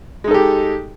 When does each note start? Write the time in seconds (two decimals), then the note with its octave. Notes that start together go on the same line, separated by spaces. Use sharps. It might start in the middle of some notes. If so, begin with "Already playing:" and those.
0.24 G#3
0.28 D#4
0.31 A4
0.34 G4